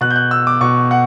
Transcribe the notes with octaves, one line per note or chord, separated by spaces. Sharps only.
B2 F#6
G6
F#6
E6
D6
B2 C#6
F#5